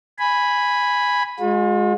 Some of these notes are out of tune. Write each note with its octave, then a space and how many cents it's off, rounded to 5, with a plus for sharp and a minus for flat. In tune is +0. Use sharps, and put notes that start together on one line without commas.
G#5 -5 B5 +0
G#3 +0 F4 +45